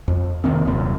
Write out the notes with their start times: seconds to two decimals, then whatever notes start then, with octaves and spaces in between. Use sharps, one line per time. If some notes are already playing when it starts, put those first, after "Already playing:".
0.08 F2
0.44 C2 D#3 A#3 C4
0.65 D#1 C2 F#2